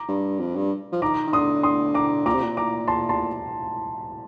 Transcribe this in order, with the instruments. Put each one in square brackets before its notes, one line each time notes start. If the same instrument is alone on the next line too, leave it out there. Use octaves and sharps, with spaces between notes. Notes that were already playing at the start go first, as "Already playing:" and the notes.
Already playing: [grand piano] A#5 D6
[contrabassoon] G2
F2
G2
F3
[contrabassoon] D#3 [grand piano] A#5 D6
[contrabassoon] D#3
[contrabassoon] D3 [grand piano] C6 D#6
[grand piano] C6 D#6
A#5 D6
[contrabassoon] A#2 [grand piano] A#5 D6
[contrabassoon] C3
A#2
[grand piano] A#5 D6
A5 C6
A5 C6